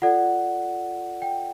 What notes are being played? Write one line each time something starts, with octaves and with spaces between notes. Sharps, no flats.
F4 A4 D5 F#5
G5